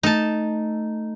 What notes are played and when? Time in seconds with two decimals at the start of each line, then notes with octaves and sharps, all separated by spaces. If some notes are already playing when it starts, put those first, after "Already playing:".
0.03 A3 D#4 A5